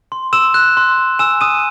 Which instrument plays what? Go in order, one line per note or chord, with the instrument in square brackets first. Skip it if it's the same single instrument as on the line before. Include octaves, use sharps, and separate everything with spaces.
[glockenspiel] C6
C6 E6 E7
F#6
C6
F#6
G#5 E6 E7
G#5 D#6 D#7